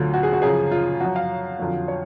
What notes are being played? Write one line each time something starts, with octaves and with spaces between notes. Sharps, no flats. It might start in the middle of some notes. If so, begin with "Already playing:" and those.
Already playing: D2 D3 F#3 F4
F#4
G#4
F#4
F#2 C#3 F3 G#4
F4
F#2 F3 F#4
F5
F2 D3 F#3
C#5